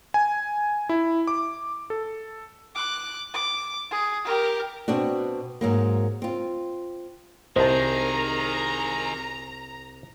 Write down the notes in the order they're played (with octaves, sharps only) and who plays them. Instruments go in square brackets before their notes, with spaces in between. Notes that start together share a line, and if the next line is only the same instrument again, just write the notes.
[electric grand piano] G#5
E4
D6
A4
[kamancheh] D6 F#6
D6
G#4
G4 A#4
[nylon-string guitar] B2 C4 D4 F#4
G#2 F#3 A#3
C4 F4
[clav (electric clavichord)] C2 D#5 [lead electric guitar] D#3 G#4 [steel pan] C5 A5 [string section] A#5